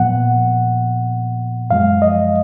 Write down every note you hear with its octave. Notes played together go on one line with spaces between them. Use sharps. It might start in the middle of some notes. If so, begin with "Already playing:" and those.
Already playing: A#2 F3 B3 F#5
F#2 F3 G#3 F5
D#5